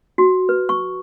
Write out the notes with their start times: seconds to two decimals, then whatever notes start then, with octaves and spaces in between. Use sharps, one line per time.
0.18 F#4
0.49 B4
0.69 C#6